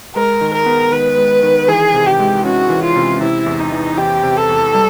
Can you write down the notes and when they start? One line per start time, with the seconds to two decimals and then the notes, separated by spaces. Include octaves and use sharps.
0.15 G#3 A#4
0.41 D#3
0.53 A#4
0.66 B3
0.92 D#3 B4
1.17 G#3
1.43 D#3
1.68 E3 G#4
1.94 C3
2.06 G4
2.19 G#3
2.45 C#4 F#4
2.70 E3
2.83 F4
2.96 C3
3.21 C3 E4
3.46 E2
3.59 D#4
3.72 E3
3.97 E2 G4
4.23 C3
4.37 A4
4.49 E2
4.74 G3